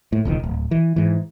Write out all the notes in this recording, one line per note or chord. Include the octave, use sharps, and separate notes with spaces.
A2
E1 C#2 A#2 D#3
D1
E3
G#2 E3